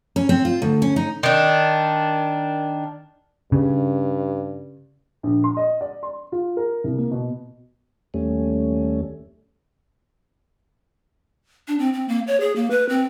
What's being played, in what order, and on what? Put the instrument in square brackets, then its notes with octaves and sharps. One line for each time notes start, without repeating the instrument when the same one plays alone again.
[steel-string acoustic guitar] C#4
C4
F4
D2
C#4
D#4
[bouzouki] D#3 D4
[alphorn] G2 [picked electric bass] C#3
[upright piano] A#1
C6
D#5
D5
C6
F4
A#4
C2
A#3
B2
[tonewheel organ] D#2 G3 A3 C#4
[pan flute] D4
C4
C4
A#3
C#5
G#4
A#3
B4
C4